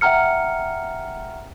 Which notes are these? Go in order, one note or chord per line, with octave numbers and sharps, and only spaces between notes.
E5 F#5 G5 A#5 F6 C#7